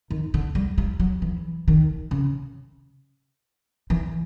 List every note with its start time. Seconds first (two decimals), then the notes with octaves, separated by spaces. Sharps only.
0.11 D#3
0.34 D3
0.55 G3
0.78 G3
1.00 F#3
1.22 E3
1.68 D#3
2.11 C#3
3.90 E3